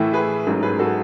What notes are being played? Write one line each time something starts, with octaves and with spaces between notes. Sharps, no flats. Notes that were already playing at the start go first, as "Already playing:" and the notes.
Already playing: A2 E3 A3 E4
G#4 B4
A1 G#2 F#3 A3
G#4 B4
F#4 A4